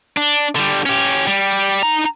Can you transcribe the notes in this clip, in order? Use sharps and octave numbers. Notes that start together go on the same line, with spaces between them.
D4
D3 G3
C#4 G4
G3
D#4 A#5